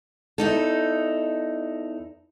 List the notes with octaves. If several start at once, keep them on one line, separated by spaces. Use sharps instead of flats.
E2 D#4 A4